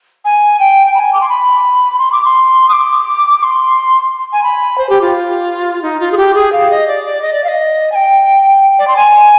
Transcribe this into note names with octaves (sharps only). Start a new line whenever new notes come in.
G#5
G5
G5
B5
G#5
D6
C6
B5
C6
D6
C6
D#6
D6
D6
C6
G#5
B5
C5
G4
F4
D#4
F4
G#4
G4
G#4
F5
D#5
D5
D5
D#5
D5
F5
D#5
G#5
G5
D5
C6
G#5